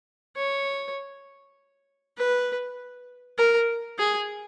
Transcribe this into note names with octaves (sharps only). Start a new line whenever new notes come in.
C#5
B4
A#4
G#4